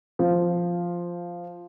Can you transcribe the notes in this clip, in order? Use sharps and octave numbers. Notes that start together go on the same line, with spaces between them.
F3